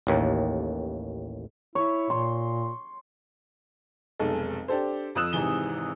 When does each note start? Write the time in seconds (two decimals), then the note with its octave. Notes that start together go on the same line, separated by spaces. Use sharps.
0.07 A1 D#2
1.75 E4 C#5
2.10 A#2 C6
4.20 F1 B1 G#3 A4
4.68 D4 G4 A4 C5
5.15 F2 F3 D#6 E6 F#6 E7
5.33 G#1 G#2 C3 E3 G7